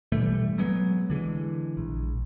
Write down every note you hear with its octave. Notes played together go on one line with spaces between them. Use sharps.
B2 E3 G3 A3
F#3 G#3 B3
D3 E3 G#3
A#1